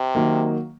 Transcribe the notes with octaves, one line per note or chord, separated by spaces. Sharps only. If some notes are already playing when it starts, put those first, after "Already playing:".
Already playing: C3
D#3 F#3 A#3